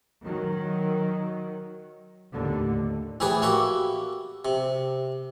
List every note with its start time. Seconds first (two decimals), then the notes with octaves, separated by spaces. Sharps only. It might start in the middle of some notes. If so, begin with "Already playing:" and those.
0.24 D#3 F#3
2.32 D#2 A2 D3
3.20 A2 E3 G4 G#4 B4
3.42 A#3 F#4 G4 E5
4.45 C3